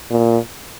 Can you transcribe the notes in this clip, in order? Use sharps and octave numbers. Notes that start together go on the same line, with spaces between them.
A#2